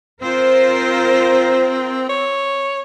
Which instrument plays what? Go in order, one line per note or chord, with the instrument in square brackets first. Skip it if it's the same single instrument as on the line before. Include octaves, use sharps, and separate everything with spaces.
[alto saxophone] C4 [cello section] F4 A#4 C5
[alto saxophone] C#5